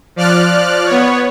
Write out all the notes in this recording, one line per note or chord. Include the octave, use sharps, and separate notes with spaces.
F3 D5 F6 F#6
B3 C#5